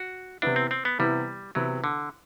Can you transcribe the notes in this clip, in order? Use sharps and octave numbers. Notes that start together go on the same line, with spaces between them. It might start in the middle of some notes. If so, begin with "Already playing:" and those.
Already playing: F#4
C3 E3 B3 D4 E4
C4
C4
B3
C3 E3 G3 B3 E4
C3 E3 F#3 B3 E4
D3